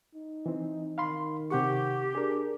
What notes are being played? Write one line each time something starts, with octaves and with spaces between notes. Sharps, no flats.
D#4
E3 C4
D#3 F5 B5 C6
C3 G4 F#5 C#6
D4 G#4 A#4